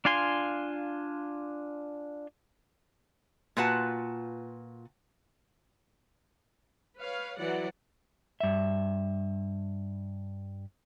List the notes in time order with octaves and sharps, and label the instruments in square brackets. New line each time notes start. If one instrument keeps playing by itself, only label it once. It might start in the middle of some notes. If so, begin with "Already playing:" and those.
[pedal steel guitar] D4 F4 F5 G#5 C6
[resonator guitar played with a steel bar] A#2 F4 F#4 B4 F#5 A5
[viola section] B4 C#5 F5
E3 F#3 D5 F#5
[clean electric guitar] G2 E5